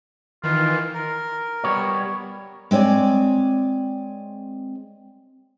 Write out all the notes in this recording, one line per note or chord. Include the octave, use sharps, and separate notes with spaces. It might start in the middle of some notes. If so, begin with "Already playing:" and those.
D#3 E3 F4
A#4
G3 B3 C#5
G#3 C4 C#5 D5 G#5